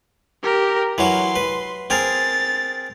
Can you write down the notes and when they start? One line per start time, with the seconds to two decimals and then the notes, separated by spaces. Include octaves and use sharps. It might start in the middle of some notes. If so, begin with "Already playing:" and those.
0.43 G4 A#4
0.98 E3 F#3 F#4 C6
1.36 B4
1.90 C4 G#4 A#4 A6